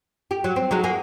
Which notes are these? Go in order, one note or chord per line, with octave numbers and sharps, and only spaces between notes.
G4
F#3
C4
F#3 G#3 D#4
A#3 F#4 G#4